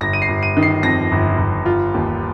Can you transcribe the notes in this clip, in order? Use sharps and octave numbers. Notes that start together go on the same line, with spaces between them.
G1 A#6
D#7
C7
G1
D#7
D#3
C7
F2 A#6
G1
G1
F4
D#2